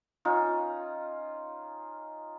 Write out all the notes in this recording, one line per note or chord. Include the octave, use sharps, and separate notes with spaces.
C#4 D#4 F4